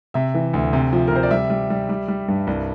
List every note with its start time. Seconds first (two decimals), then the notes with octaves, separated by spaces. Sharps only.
0.14 C3 E5
0.34 E3
0.53 D2
0.73 C3
0.93 F3
1.08 A#4
1.11 C3 C5
1.23 D5
1.31 G3 E5
1.50 G3
1.70 G3
1.89 G3
2.08 G3
2.28 G2
2.47 C2